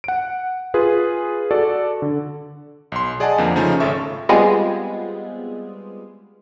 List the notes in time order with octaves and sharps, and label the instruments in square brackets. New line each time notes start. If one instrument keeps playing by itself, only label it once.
[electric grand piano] F#5 D7
F4 G#4 B4
F#4 A4 D5
D3
B1 C6
G#4 D5 D#5 F#5 G#5 A5
F2 D3 F3 A#3
C#3 F3 A3 C#4 D#4
G#1 C#3 A4 E5 C#6
[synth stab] G3 G#3 B3 C4 F4 G#4